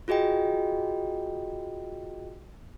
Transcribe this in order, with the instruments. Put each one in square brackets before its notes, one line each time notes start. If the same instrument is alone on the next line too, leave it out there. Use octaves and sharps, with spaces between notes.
[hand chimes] F4 F#4 G#4 D#5 G5